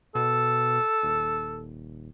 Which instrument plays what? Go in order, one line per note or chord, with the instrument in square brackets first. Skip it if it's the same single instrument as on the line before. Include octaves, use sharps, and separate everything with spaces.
[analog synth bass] B2 [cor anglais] A4
[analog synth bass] D#1